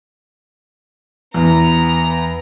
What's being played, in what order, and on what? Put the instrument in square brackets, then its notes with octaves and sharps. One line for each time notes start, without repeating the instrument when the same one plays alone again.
[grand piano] E2 [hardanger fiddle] B3 A#5